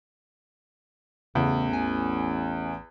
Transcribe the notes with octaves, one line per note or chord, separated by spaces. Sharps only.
A1 E2 C#3
G#5